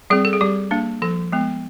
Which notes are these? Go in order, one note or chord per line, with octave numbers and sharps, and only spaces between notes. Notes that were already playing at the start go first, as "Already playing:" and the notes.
G3 C4 G#4
A4
G#4
G3 G4
A#3 D4
F3 A4
G#3 B3